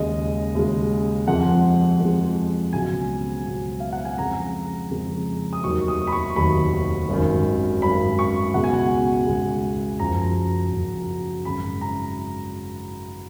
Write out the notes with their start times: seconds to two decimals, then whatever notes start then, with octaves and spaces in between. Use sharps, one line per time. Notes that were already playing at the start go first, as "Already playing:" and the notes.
Already playing: D#2 C#3 G#3 D#5
0.55 D#2 C#3 G#3
1.28 F2 F3 G#3 F#5
2.00 F2 F3 G#3
2.73 C#2 B2 F#3 G#5
3.46 C#2 B2 F#3
3.80 F5
3.93 F#5
4.05 G#5
4.18 F2 C#3 G#3 A#5
4.91 F2 C#3 G#3
5.53 D#6
5.63 F1 D#2 D#3 F#3 C#6
5.88 D#6
6.07 B5
6.12 C#6
6.36 F1 D#2 D#3 F#3 B5
7.09 G#1 F#2 D#3
7.82 G#1 F#2 D#3 B5
8.19 C#6
8.54 C#2 B2 G#3 F#5
8.64 G#5
8.74 F#5
9.27 C#2 B2 G#3
10.00 F#1 F#2 F3 A#5
10.72 F#1 F#2 F3
11.45 G#1 F#2 C#3 B5
11.81 A#5